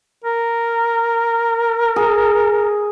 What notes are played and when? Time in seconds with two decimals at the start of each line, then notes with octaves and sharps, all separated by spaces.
0.24 A#4
1.96 G#4